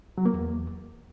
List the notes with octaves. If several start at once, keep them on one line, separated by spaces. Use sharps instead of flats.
F#3
A#3
E2